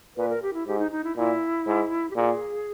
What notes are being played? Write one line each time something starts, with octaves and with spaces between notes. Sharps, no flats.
A#2 B4
A#4
G4
E4
G#2 G4
D#4
D#4
E4
A#2 E4
G#2
G4
A#2 G#4